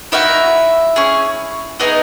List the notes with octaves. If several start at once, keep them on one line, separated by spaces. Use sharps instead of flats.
A#3 D#4 E4 F#4 E5
C#4 G#4
B3 D#4 E4 G#4 D#5